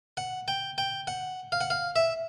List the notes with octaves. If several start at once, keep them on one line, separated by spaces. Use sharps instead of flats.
F#5
G5
G5
F#5
F5
F#5
F5
E5